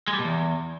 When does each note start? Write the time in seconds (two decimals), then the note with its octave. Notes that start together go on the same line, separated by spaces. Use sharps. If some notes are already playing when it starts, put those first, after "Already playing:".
0.08 G#3
0.13 G3
0.19 B2
0.24 E2